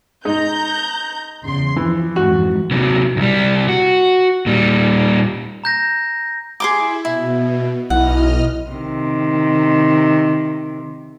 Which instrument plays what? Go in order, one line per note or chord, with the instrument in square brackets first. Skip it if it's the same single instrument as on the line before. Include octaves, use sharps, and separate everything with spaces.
[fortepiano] G#3 D#4 [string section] A#5 G6
[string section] E2 C#3 C6
[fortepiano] E3 [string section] F3
[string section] F2 G#2 E3 [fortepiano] F#4
[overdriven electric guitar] C3 F#3
C2 G3
F#4
A#2 G3
[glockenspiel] A#5 G6 A#6
[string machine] E4 [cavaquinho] G#4 C6 D6
[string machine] B2 [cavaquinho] E4
[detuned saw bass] B1 [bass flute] E4 [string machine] D#5 F6 [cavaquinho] F#5
[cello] C3 D#3